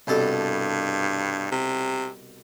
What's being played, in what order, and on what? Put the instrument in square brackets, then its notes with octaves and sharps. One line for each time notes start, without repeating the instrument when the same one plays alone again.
[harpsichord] C2 B2 A4 [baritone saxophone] G2
[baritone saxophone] C3